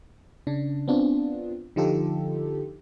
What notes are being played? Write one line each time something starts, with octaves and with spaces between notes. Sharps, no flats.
C#3 D4
B3 C4 D4 F4
D3 F3 D#4 F4 G4 A4